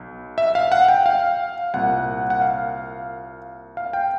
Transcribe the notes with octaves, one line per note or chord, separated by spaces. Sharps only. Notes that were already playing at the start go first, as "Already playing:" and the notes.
Already playing: B1
E5
F5
F#5
G5
F5
C2 A#2 F#5
F#5
F5
F5
G5